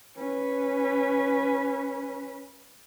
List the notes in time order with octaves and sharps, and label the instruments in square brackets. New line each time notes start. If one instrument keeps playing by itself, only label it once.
[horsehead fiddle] C#4 B4